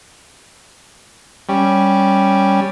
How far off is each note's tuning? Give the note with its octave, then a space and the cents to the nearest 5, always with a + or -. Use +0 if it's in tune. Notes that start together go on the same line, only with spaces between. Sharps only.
G3 +0 C#4 +0